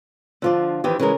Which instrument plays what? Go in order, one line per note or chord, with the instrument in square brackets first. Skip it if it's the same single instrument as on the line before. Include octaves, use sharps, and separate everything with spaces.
[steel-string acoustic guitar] D3 F3 [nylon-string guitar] D4 F4 D5
[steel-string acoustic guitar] F2 D#3 E3 [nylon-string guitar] G4
[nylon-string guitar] C#3 C#4 A#4 [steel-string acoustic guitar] E3 G#3